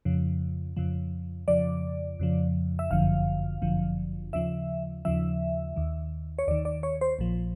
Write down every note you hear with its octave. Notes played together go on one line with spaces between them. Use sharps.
F2 C#3 F3
F2 C#3 F3
F2 C#3 F3 D5
F2 C#3 F3
E5
G1 F#2 D3 F3 F5
G1 F#2 D3 F3
D#2 C#3 F3 E5
D#2 C#3 F3 E5
D#2 D#3
C#5
D#2 D#3 D5
D5
C#5
C5
A#1 A#2 F3